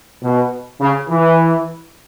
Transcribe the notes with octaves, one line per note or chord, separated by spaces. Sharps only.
B2
C#3
E3